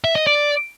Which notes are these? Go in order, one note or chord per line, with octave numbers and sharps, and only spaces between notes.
E5
D#5
D5